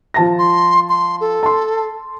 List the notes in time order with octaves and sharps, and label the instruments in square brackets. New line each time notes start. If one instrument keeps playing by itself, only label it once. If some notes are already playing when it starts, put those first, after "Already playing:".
[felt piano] F3 A5 A#6
[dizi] C6
C6
A4
[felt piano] A5 C6